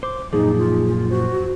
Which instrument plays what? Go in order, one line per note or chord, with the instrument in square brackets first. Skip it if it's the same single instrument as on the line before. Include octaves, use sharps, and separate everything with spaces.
[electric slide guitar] C5 [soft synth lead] D6
[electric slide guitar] F#2 A#2 F3 [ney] D#4 [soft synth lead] G#4
[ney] F4
F4
[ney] F#4 [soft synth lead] C5